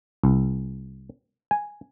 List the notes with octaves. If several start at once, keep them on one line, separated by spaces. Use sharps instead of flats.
C2
G#5